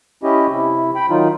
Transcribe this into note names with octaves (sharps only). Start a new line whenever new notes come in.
C#4 E4 G4 D#5
C3 E4
G5 B5
D#3 F#3 D#4 F4